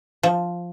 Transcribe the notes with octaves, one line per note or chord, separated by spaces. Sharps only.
F3